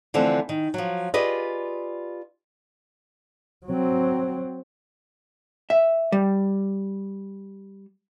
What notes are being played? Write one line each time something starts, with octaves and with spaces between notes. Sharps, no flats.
D3 E3 F3 A3 C4
D#3
F3 F#3
F4 G4 G#4 B4 D5 D#5
F#3 C4
E5
G3